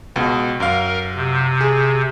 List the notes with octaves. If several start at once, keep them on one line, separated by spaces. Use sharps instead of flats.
C#2 B2
F#2 A#4 F5
C3
G#4